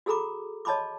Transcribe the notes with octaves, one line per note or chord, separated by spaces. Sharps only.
F#4 G#4 A4 A#5 B5 D6
C#5 D#5 A5 B5 C6 D6